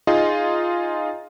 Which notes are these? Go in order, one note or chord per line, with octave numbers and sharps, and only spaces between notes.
D#4 F4 G#4 D#5